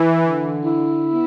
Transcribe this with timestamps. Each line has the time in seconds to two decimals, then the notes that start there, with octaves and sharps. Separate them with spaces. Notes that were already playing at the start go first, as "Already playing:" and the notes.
Already playing: E3
0.20 D3
0.64 E4
1.08 B3